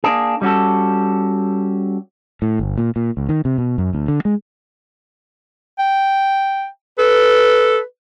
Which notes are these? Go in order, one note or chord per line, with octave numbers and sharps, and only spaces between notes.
A#3 D4 G#4
G3 C#4 F#4 A4
A2
G1
A#2
A#2
C#2
D#3
C3
B2
F#2
D2
D3
G#3
G5
A4 B4